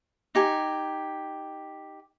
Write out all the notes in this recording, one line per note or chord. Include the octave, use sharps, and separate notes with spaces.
D#4 G4 G#5